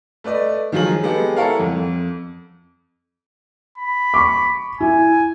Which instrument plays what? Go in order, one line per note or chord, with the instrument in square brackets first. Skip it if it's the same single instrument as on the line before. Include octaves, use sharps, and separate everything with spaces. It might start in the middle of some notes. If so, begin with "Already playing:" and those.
[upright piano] A3 B4 D5 D#5
D#3 F3 F#3 G#4 F#7
G#3 B3 G4 A4
E4 A4 A#4 C#5 F5 F#5
F2
[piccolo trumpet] B5
[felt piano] C#6 D6
[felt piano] E4 [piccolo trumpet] G#5